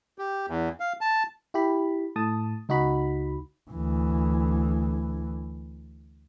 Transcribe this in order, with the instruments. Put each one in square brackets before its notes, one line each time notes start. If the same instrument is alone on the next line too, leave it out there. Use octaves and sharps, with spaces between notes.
[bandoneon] G4
E2
F5
A5
[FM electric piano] E4 G4 B5
A2 A5 D#6
C#2 D#4 F#4 B5
[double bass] D2 E3